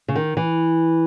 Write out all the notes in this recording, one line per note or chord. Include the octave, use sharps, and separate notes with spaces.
C#3
D#3
E3